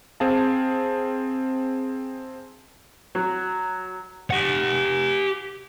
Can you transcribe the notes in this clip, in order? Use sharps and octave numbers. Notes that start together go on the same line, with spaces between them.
C4 G#4 F5 A5
F#3
G4 F#5